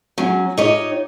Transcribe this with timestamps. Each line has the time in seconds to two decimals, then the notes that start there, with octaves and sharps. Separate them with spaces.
0.18 F#3 C#4
0.57 D#4 F4 G4 C#5 D#5